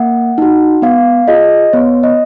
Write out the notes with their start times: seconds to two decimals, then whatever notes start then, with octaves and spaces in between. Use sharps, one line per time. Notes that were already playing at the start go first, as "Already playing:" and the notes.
Already playing: A#3 F#5
0.38 D#4 F#4
0.82 B3 F5
1.28 F4 G#4 D#5
1.73 B3 C#5
2.03 D#5